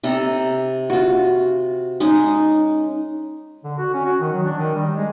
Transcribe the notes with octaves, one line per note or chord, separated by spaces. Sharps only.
C3 A4 A#5
F4 F#4
G#3 C#4 D#4
D3
F#4
C#4
F#4
D#3
F#3
D4
D#3
G3
G#3